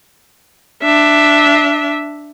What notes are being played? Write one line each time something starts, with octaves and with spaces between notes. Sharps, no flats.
D4 E5